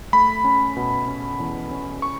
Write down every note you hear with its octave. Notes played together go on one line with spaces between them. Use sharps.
A3 B5
C#4
B2
C#4
E2
C#4
C#6